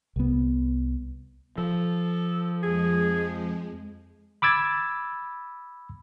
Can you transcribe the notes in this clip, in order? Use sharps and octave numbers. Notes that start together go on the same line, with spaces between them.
C2 B3
F3 A4
F2 G#3 G#4
B5 D6 E6 G#6 A6